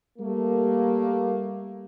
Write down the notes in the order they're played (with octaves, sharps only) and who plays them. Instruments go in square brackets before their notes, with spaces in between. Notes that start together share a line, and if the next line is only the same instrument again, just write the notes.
[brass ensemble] G3 A3 A#3